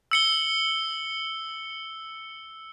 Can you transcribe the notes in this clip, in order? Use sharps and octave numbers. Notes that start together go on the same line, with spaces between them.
E6 C#7 G7